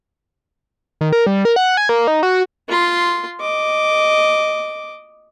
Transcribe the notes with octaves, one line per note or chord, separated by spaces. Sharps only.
D#3
A#4
G3
A#4
F#5
G#5
A#3
D#4
F#4
F4 C6
D#5 D6